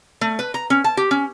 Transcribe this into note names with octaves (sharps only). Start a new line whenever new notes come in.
A3
B4
A#5
C#4
A5
G4
C#4